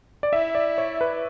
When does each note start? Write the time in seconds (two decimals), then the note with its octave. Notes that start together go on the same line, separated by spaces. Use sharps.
0.23 D5
0.33 E4 E5
0.55 D5
0.78 C#5
1.01 B4